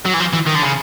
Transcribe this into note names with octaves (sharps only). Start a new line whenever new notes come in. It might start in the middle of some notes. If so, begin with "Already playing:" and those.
F#3
E3
F3
E3
D#3
D3
C#3